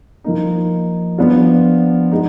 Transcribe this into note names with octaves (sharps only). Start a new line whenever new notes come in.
F3 A#3 D#4
F3 B3 D4 F4
G#3 D#4